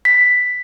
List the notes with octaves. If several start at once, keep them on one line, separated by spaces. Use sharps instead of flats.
B6